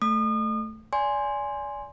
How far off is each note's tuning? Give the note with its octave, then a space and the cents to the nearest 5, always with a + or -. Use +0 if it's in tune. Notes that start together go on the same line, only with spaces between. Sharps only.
A3 +0 D#6 -35
D5 -25 G#5 +0 C6 +0